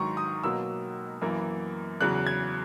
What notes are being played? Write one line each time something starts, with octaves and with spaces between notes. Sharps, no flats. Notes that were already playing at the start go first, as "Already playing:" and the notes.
Already playing: G#2 D#3 F#3 A#5 C#6
D#6
B2 F#3 A#3 E6
F#2 E3 A#3
E2 C#3 F#3 F#6
G#6